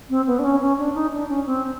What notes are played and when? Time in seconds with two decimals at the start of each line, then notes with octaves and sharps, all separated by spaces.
0.09 C4
0.27 B3
0.39 D4
0.44 C#4
0.61 C#4
0.78 D4
0.95 D#4
1.12 D4
1.29 C#4
1.46 C4